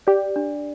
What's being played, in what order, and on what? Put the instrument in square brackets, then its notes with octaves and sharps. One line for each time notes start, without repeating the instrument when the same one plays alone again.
[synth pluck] G4 [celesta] D5
[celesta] D4